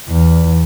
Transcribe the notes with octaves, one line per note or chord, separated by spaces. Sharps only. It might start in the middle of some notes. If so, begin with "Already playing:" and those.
E2